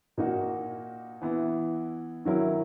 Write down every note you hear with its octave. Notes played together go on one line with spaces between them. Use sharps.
A#2 A#3 D#4 F#4
E3 B3 E4
D#3 F#3 C#4 E4 A#4